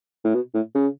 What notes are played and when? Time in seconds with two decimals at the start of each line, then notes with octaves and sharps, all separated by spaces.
0.25 A2
0.34 B2
0.54 A2
0.75 C#3